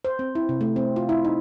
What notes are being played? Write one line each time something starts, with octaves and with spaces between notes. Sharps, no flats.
C5
C4
E4
C3
A3
C4
F4
E4
D#4